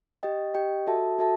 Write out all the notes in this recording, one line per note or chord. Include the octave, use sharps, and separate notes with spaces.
G4 D#5 G5
G4 D#5 G5
F#4 A4 E5 A5
F#4 A4 E5 A5